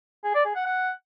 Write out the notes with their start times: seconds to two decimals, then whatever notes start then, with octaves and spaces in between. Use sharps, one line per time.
0.24 G#4
0.35 D5
0.45 G#4
0.56 F#5
0.66 F#5